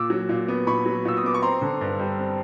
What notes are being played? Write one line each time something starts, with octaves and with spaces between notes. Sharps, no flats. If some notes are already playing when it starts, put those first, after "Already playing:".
Already playing: A#2 D6 E6
F#3
A#2
B3
A#2 B5 C#6
F#3
A#2 E6
D#6
B3 D6
C#6
C4 A#5 C6
D3
G2
G3
C4